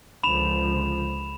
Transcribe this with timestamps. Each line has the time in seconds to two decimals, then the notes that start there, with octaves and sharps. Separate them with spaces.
0.23 C#2 D3 F3 B5 E7 F7